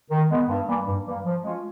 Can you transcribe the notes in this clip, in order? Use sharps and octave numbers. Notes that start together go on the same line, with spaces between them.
D#3
G#3 B3
G2
E3 G3 A#3
G2
E3 G3 A#3
F3
G#3 C#4 F4